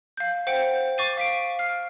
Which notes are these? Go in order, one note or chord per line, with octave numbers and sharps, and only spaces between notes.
F5 G6
C5 F#5 G5 G6
C#6 D6 A6 C7 D#7
F5 B6 C7 D7
F6 C7